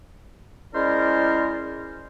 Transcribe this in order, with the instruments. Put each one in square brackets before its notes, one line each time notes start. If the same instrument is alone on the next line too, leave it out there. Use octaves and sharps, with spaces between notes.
[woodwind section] G#3 C#4 E4 A#4 C5 D5